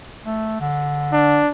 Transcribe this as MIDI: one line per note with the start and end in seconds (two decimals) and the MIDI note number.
0.25 0.60 57
0.61 1.41 50
1.13 1.51 62